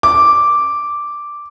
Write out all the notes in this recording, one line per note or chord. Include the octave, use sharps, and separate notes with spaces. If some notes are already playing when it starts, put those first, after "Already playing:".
D6